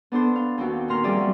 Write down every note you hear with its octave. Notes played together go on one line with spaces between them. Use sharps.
B3 D4 A4 C5
F5
D#2 C4 F#4
A#2 D#3 A#5 C6 F6
F3 G3 C4 G#4 D5 E5
F#3 G3